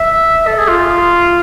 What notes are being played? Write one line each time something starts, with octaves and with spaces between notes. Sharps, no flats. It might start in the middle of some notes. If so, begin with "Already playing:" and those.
Already playing: E5
A4
G#4
F4